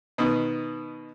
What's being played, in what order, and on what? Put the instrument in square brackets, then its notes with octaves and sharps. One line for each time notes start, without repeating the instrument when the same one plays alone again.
[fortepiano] B2 D#3 B3